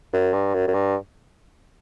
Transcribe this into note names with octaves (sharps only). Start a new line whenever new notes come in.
F#2
G2
F#2
F#2
G2